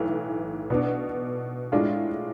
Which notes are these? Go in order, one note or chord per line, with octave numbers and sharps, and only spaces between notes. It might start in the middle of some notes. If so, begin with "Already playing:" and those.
Already playing: B1 A2 E3
B2 B3 D4
A2 G#3 D4 F4